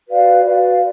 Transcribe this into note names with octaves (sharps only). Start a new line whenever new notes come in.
F#4 B4 D5 F5
F#4 B4 D5 F5